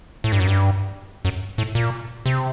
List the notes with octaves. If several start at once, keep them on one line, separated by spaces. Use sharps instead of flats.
A2
G2
F#2
G2
F#2
A2
A#2
C3